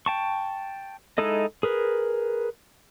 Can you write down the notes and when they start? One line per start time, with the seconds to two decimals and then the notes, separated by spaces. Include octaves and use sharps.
0.06 G5 A5 C#6
1.18 G#3 D#4 E4 A4 D#5
1.63 G#4 A#4 B4